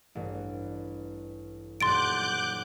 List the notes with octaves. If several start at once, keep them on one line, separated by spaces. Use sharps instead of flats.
A1 G2
D#1 F#2 C6 D6 F#6 G6 A6 D7